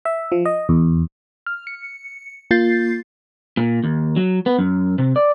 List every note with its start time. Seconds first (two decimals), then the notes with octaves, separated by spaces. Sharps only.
0.05 E5
0.32 F3
0.45 D#5
0.69 E2
1.47 F6
1.67 C#7
2.51 A#3 F4 G6 A6 C7
3.57 A#2
3.84 D#2
4.16 F#3
4.46 B3
4.59 F#2
4.98 C3
5.16 D5